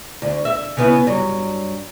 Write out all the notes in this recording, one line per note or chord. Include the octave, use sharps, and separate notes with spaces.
D2
E5
C#3 B3 E4
G2 F#3